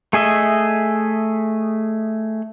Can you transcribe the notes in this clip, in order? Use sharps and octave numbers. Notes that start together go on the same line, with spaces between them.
A3 G#4 D#5 E5